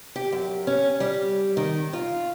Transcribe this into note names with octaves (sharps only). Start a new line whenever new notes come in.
G4
F#2
C#4
G3
D#3
F4